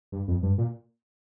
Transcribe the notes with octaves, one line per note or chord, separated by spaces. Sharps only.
G2
F2
G2
A#2